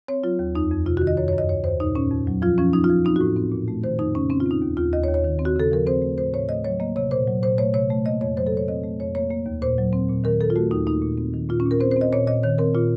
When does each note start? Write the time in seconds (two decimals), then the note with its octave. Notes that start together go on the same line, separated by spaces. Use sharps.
0.08 C4 C#5
0.24 F#3 F4
0.39 D#2
0.55 F2 D#4
0.71 F2
0.86 C3 F4
0.97 F#4
1.02 D#3
1.07 D#5
1.17 F#2 C#5
1.28 C#5
1.33 F#2
1.38 D#5
1.49 D#2 C#5
1.64 D#2 C5
1.80 A#2 D#4
1.95 A#2 C#4
2.11 F2
2.27 F#3
2.42 F3 F4
2.58 F3 C#4
2.73 F3 D#4
2.84 F4
2.90 F3
3.05 C4 D#4
3.16 F#4
3.21 A2
3.36 C4
3.52 A#2
3.68 A3
3.83 D#3 C5
3.99 F2 D#4
4.15 C#3 C#4
4.30 C4 C#4
4.40 F4
4.46 C4 D#4
4.62 D#2
4.77 D#2 F4
4.93 D#2 D#5
5.04 C#5
5.08 D#2
5.14 C#5
5.24 D#3
5.39 C4
5.45 F#4
5.56 C#3 A4
5.71 F3 A#4
5.87 C4 C5
6.02 A3
6.18 A2 C5
6.33 A2 C#5
6.49 A3 D#5
6.65 F#3 C#5
6.80 A#3 D#5
6.96 C3 C#5
7.11 A#2 C5
7.27 F#3
7.43 A#2 C5
7.58 A3 C#5
7.74 C3 C#5
7.90 A3
8.05 A#3 D#5
8.21 F2 C#5
8.37 F#3 C5
8.47 A4
8.52 C3
8.57 C#5
8.68 C4 D#5
8.83 A3
8.99 F2 C#5
9.15 A#3 C#5
9.30 A#3
9.46 D#2
9.62 A#2 C5
9.78 F#3
9.93 C4
10.09 A#2
10.24 D#3 A#4
10.40 D#3 A4
10.50 F4
10.56 A3 F#4
10.71 D#2 D#4
10.87 A#3 D#4
11.02 A#2
11.18 C4
11.34 D#3
11.49 A#2 F4
11.60 C#4
11.65 A#2
11.71 A#4
11.80 C4 C5
11.91 C5
11.97 C4 D#5
12.12 A#2 C#5
12.27 A#2 D#5
12.43 D#3 C#5
12.58 C4 A#4
12.75 A#2 F4